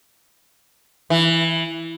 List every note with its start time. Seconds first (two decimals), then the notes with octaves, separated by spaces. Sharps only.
1.10 E3